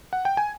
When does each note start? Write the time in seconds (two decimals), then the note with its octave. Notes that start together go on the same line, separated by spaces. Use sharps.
0.13 F#5
0.25 G5
0.37 G#5